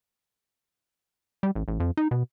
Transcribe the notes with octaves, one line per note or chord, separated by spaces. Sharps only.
G3
A1
A1
F2
D#4
B2